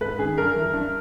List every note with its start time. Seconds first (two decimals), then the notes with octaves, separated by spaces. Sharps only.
0.01 G#2 B4
0.19 D#3 G#4
0.38 G2 A#4
0.56 E3
0.73 G2